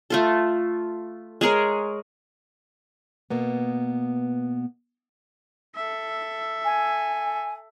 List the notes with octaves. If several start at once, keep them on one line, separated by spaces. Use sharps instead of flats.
A3 F4 A4
G#3 G#4 A#4 C#5
B2 A#3 B3
A4 E5
G#5